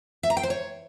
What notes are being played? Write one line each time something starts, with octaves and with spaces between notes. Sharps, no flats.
E5
A#5
G5
C5
C#5